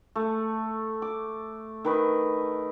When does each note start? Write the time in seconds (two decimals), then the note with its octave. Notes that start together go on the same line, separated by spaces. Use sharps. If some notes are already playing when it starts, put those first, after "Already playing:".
0.15 A3
1.02 D6
1.85 D#3 B4 D#5